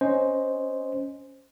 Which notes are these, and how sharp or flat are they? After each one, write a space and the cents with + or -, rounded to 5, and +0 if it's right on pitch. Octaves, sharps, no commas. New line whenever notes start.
C#4 +0 C5 +0 D#5 +0